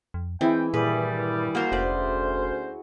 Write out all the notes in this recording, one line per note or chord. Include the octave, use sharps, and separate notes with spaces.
F2
E3 G#3 C4 E4 G5
G2 A#2 D#3 G3 G#4 B4
A#3 F#4 A#4 C5
F1 D2 C#4 B4 C5 D5